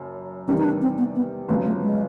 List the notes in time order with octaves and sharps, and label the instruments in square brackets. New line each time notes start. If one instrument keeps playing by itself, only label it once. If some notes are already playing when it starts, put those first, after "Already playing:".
Already playing: [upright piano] F#1 F#2
[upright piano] F1 E2 C3 D#3 G3 [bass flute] C#4
[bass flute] D#4
D4
C4
B3
B3
[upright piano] G1 F2 C#3 F#3 [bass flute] A3
[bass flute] A3
G#3